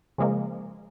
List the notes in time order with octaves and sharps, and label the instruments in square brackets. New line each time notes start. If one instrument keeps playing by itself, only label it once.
[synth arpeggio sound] C#3 F3 G#3 A#3